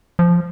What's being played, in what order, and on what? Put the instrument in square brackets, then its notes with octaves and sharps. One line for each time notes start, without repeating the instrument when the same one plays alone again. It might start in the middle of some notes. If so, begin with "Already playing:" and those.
[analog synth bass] F3